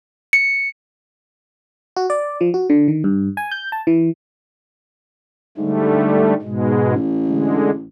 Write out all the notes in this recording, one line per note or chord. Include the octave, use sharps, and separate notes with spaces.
C#7
F#4
D5
F3
F#4
D3
D#3
G2
G#5
G6
A5
E3
G#2 D3 G3 A3
G#2 B2 G#3
A1
D3 G#3